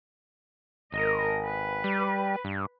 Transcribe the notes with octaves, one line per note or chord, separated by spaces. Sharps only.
G#1 A#4 D#5
B4
G3
G2